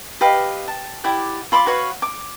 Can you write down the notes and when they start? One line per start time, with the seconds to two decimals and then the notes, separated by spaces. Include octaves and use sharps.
0.21 G4 B4 D#5 F5
0.68 A5
1.04 E4 G4 D5 F#5
1.52 F4 B5 C6 D6
1.66 F#4 B4 C#5 F5
2.02 D6